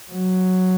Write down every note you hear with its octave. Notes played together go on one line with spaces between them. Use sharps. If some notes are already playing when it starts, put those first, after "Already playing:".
F#3